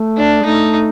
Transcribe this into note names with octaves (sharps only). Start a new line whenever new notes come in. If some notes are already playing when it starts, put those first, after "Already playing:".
Already playing: A3
D4
G#3
A3 D#4